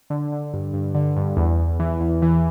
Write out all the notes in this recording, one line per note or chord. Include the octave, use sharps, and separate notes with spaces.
D3
D3
G2
G2
D3
G2
E2
E2
E3
E2
E3